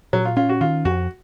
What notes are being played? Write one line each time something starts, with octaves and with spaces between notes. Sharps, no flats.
A#2 F#3
F4
C#4 F4
F#4
D#3 F4
F2 F#4